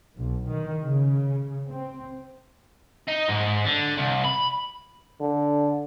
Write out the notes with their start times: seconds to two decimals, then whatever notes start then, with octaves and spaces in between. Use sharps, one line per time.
0.17 B1
0.48 D#3
0.84 C#3
1.69 C4
3.08 D#4
3.30 G#2
3.66 D3
3.98 C2
4.25 B5
5.20 D3